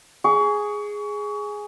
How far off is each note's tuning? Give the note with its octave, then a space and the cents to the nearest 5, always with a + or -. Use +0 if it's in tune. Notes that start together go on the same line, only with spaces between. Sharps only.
G#4 +0 C#6 +30